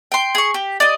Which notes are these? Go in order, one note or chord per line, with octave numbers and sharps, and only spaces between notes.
G5 C6
G#4 C#6
G4
D5 D#5